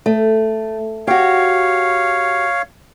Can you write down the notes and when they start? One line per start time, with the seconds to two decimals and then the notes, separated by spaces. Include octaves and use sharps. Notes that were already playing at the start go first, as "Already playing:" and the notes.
0.06 A3
1.07 F#4 G4 C#5 F5